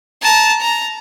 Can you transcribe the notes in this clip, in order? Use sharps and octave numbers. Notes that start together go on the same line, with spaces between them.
A5 A#5
A#5